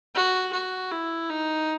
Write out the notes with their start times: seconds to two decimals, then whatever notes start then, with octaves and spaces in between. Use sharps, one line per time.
0.15 F#4
0.53 F#4
0.91 E4
1.29 D#4